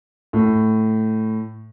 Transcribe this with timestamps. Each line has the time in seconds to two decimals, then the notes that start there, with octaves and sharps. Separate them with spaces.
0.33 A2